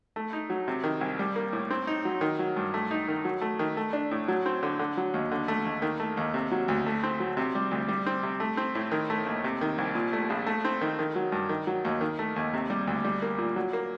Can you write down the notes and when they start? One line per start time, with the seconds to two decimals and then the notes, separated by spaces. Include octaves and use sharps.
0.16 A3
0.33 D#4
0.50 F#3
0.68 C3
0.84 D#3
1.01 C2
1.19 G3
1.36 A#3
1.53 A2
1.70 C4
1.87 D#4
2.05 F#3
2.21 D#3
2.39 F#3
2.56 G2
2.74 A3
2.91 D#4
3.08 D#3
3.25 F#3
3.41 A3
3.59 D#3
3.77 A3
3.93 D4
4.11 A2
4.28 F#3
4.46 C4
4.63 D3
4.79 D3
4.97 F#3
5.14 D#2
5.32 D3
5.48 A3
5.65 D#2
5.82 D#3
6.00 A3
6.17 D#2
6.34 C3
6.51 F#3
6.68 D2
6.86 A3
7.03 C4
7.20 F#3
7.37 C3
7.55 G3
7.71 D2
7.89 G3
8.06 C4
8.23 C3
8.40 A3
8.57 C4
8.75 A2
8.92 D#3
9.10 A3
9.26 D#2
9.44 C3
9.61 D#3
9.78 C2
9.95 A#2
10.13 A3
10.30 A#1
10.46 A3
10.65 C4
10.81 D#3
10.99 D#3
11.16 F#3
11.32 G2
11.49 D#3
11.67 F#3
11.85 D#2
12.01 D#3
12.19 A3
12.36 D#2
12.54 C3
12.70 G3
12.87 D2
13.05 G3
13.22 A#3
13.38 A#2
13.56 F#3
13.73 A#3